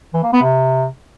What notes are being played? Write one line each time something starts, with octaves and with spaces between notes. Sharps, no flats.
E3
A#3
B3
C3